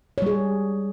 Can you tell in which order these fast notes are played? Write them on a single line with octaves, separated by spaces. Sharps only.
C#5 G3 G#4